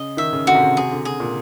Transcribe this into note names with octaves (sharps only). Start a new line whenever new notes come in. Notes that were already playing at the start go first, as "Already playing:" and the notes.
Already playing: C#3 D#5
D#3 E5
C#3
D3 F#4
C3
C#3
C3 G#4
D3
G#4
A#2